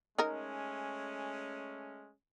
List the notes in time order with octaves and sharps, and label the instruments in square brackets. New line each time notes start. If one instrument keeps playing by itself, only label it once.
[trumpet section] G#3 A3 C#4 [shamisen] D#4 A#4